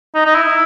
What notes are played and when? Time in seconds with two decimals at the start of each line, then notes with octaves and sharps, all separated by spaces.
0.15 D#4
0.25 D#4
0.35 E4